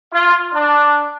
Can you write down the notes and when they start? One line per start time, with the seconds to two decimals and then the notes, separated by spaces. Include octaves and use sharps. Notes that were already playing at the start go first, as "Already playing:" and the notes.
0.12 F4
0.54 D4